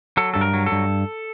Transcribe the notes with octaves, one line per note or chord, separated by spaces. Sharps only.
F#3 A4
G2 A4
A#4
F#3
A4
G2